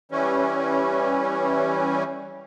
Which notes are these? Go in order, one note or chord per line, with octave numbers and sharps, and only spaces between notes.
E3 G3 C#4